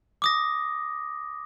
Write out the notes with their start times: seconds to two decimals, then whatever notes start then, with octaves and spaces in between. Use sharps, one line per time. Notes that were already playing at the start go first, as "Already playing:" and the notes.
0.22 D6 D#6 A#6